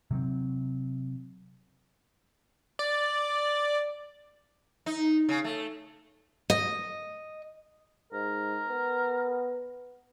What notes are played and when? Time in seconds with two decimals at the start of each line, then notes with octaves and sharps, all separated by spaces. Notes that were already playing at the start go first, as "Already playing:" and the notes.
0.11 C3 F#3 C4
2.79 D5
4.86 D#4
5.29 C#3
5.44 A3
6.50 D#5
8.13 G#2 A#4
8.68 B3